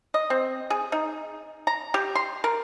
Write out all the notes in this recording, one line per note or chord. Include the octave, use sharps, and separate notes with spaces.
D#5
C4
G#4
D#4
A#5
G4
C6
A#4